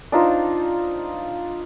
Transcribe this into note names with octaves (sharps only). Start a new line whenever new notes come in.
D4 D#4 F4 C5